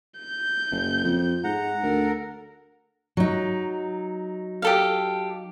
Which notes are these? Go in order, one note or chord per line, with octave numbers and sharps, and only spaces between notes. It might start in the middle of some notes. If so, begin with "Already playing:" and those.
G6
F#1
F2
G#2 F#5 A#5
D2 A4 A#4
F#3 D#4
G4 A4 F5